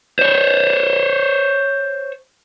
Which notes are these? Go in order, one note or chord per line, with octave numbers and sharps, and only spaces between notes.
C5 C#5